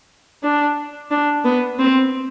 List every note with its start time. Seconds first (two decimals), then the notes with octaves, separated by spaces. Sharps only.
0.43 D4
1.11 D4
1.45 B3
1.79 C4